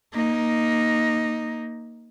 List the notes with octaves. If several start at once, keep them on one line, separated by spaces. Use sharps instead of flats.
A#3 D#4